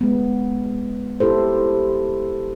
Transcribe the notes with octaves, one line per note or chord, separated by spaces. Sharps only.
G#3 B3
E4 G4 A4 C5